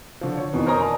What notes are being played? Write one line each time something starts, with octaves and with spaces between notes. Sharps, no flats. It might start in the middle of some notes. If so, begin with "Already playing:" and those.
D3 F3
C#5
F2 B2 D#3 E3
A#4 C5 C#5 G#5 A#5 D#6
D5 D#5 A5 A#5